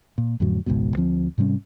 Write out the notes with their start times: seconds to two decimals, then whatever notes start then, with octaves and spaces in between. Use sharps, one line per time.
0.18 A#2
0.40 F2 A2 D3 F#3
0.66 G#1 C#2 G#2 B2
0.96 D2 F3 C4
1.38 G#2 C3 G3 C#4